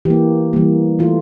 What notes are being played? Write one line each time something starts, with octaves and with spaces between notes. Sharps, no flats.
E3 A#3 G4
E3 G3 A#3
E3 A3 F4